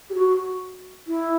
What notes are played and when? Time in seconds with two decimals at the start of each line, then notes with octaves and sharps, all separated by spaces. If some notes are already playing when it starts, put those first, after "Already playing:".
0.10 G4
0.15 F#4
1.07 E4